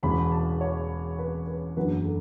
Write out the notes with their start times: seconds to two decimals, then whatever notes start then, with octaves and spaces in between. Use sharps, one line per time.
0.03 E1 E2 C#3 B5
0.32 A5
0.61 C#5
1.19 B4
1.47 B4
1.77 F#1 E2 D3 F#3 B4
2.05 A4